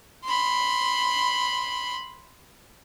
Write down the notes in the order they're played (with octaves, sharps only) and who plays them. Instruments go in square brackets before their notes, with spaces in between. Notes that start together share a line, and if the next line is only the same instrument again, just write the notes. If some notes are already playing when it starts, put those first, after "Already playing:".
[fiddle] B5 C6